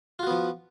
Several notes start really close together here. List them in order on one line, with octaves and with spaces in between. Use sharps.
F4 F#4 B3 F3